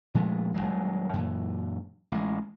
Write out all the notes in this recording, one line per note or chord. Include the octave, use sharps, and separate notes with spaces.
A#2 F3 G#3 A3
D#1 E2 F#3 G#3
F#2 A#2 E3
A1 G#3